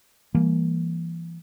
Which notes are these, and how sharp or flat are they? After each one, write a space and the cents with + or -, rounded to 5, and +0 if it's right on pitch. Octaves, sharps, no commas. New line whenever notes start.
E3 +30 G3 +40 A#3 +0